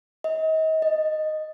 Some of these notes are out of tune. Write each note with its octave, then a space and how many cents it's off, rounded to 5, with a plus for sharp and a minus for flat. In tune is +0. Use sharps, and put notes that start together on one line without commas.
D#5 +35
D#5 -5